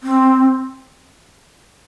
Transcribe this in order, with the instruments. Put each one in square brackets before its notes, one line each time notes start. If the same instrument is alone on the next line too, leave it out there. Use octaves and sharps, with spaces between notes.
[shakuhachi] C4